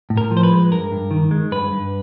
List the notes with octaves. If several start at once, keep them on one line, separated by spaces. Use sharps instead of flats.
A2
A#4
F3
C5
B4
G#3
G2 A#4
G2
D#3
G#3
G2 B4
G2